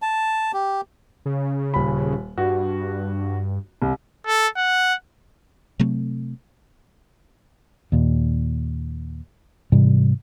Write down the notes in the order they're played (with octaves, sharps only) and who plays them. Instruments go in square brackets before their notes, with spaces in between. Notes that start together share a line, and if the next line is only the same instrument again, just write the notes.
[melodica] A5
G4
[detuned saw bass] C#3
[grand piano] D#1 B5
[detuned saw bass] G2 [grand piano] F#4
[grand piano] C2
[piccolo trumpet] A4
F#5
[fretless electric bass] C3 F#3 A3 C4
D#2 A#2
G#2 C3 E3 G3